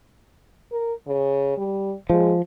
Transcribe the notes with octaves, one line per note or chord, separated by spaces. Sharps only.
A#4
C#3
G3
F3 G#3